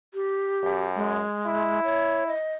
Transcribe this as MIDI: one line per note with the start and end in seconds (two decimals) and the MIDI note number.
0.14 0.83 67
0.64 1.23 42
0.96 1.80 56
1.46 2.31 64
1.84 2.24 73
2.27 2.53 75